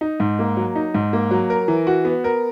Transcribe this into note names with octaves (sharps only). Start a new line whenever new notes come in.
D#4
G#2
A#3
F#3
D#4
G#2
A#3
F#3
A#4
E3
F#4
B3
A#4